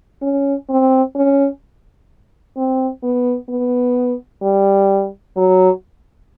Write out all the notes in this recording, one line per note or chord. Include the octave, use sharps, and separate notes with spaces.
C#4
C4
C#4
C4
B3
B3
G3
F#3